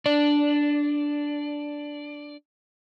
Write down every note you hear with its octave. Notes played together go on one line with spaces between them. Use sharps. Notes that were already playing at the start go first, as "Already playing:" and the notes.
D4 D5